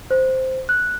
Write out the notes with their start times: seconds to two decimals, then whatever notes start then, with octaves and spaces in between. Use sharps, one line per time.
0.11 C5
0.69 F#6